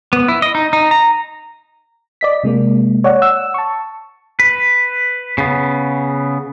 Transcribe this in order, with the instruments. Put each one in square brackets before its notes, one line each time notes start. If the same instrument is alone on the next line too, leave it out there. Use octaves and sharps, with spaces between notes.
[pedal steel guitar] B3
E4
D#5
D#4
D#4
A#5
[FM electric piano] D5 D#5 B6
C3 G#3 A#3
C#5 D5 F#5
F#5 E6
A5 C#6
[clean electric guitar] B4
C#3 B3